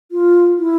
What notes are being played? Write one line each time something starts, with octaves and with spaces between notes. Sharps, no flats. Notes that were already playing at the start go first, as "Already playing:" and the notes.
F4
E4